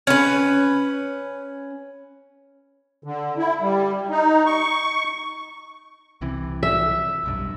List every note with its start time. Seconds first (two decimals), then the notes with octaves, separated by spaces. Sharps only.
0.07 C#4 B4
3.04 D3
3.38 E4
3.61 G3
4.10 D#4
4.46 C#6
6.21 C2 C3 E3
6.63 E5
7.24 F1 B1 G2